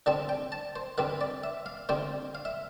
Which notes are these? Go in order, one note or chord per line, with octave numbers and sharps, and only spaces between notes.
D3 G3 C4 A5
G5
A5
C5
D3 G3 C4 B4
D5
E5
F5
D3 G3 C4 G5
F5
E5